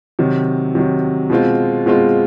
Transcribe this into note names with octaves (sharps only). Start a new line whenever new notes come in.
C3 D#3 F#3
C3 D#3 F#3
B2 G#3 C4 F4
B2 G#3 C4 F4